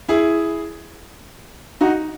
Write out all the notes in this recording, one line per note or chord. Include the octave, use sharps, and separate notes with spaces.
E4 G#4
D#4 F#4